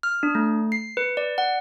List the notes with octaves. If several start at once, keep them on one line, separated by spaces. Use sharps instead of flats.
F6
D4
A3
C7
B4
D5
F#5